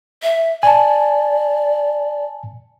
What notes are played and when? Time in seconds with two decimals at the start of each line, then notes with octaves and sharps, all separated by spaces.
0.23 E5
0.63 D5 G#5 A5